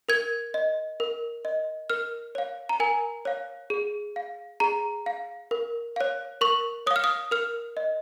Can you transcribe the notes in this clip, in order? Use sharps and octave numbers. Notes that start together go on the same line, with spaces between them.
A#4 G#6
D#5
A#4
D#5
A#4 F6
C#5 F5
A#5
A#4 G#5
C#5 F5
G#4
F5
G#4 A#5
F5
A#4
C#5 F5
A#4 C#6
C#5 F5 D#6
F6
D#6
A#4 F6
D#5